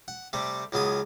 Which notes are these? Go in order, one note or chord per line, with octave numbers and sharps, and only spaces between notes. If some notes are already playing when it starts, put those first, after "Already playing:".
F#5
C3 G3 A3
C#2 C#3 F#3 B3 D#6